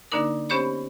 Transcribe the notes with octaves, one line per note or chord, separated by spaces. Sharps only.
D3 A#3 D4 D#4 A#4
B3 C#4 G4 C5 C#5 B5